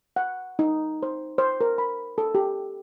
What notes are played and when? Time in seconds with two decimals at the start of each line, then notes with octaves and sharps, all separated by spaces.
0.16 F#5
0.59 D#4
1.03 C5
1.38 C5
1.61 A#4
1.78 B5
2.18 A4
2.35 G4